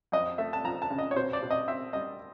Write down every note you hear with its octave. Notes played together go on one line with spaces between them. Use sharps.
F2 D#5
A3 E5
A5
F3 A#5
A5
C#3
D#5
C#5
B2 C5
D5
B2
D#5
C4 E5
G3 D#5